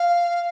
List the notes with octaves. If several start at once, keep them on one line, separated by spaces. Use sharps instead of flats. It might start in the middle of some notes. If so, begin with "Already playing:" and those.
Already playing: F5